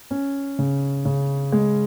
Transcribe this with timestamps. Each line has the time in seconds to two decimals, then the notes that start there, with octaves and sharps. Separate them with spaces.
0.11 C#4
0.59 C#3
1.05 C#3
1.52 G#3